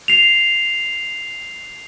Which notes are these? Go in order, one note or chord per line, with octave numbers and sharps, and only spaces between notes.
C7 F7